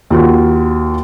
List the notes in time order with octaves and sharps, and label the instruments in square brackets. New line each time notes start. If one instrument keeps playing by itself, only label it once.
[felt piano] D#2 F4 F#4